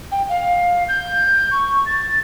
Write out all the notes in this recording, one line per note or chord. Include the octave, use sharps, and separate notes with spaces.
G5
F5
G6
C#6
A6